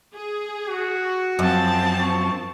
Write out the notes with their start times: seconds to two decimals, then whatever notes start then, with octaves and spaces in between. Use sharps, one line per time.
0.15 G#4
0.68 F#4
1.39 F#2 F3 C4 A5
2.00 C#6